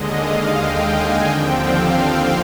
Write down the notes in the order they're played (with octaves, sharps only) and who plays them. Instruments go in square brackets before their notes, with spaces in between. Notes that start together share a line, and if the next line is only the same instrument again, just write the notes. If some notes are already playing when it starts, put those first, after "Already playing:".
Already playing: [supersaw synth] D#2 D3 G#3 D#5
F5
G5
G#5
D#2 D3 F3 C4 G5
F5